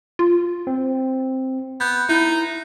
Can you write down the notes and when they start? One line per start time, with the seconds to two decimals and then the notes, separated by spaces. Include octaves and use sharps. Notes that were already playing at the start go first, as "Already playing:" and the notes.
0.19 F4
0.67 C4
1.81 B3 G6
2.09 D#4 E4